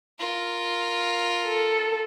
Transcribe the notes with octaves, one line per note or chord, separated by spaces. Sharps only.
F4 A#4
A4